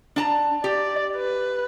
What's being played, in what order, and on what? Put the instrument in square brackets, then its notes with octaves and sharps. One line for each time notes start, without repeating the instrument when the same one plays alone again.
[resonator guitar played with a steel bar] D4 A5 A#5
[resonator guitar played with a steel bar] G4 [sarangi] D5
[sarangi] B4